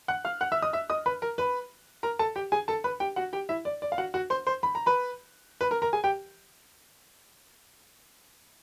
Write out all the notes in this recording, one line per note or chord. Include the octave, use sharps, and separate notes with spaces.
F#5 F#6
F5 F6
F#5 F#6
E5 E6
D#5 D#6
E5 E6
D#5 D#6
B4 B5
A#4 A#5
B4 B5
A#4 A#5
A4 A5
G4 G5
G#4 G#5
A4 A5
B4 B5
G4 G5
F#4 F#5
G4 G5
E4 E5
D5
D5
F5
F#4 F#5
F#4 F#5
C5 C6
C5 C6
B5
A#5
B4 B5
B4 B5
A#4 A#5
A#4 A#5
G#4 G#5
G4 G5